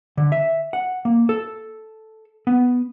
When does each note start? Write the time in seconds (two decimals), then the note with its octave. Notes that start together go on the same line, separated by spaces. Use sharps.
0.17 D3
0.32 E5
0.73 F#5
1.05 A#3
1.29 A4
2.47 B3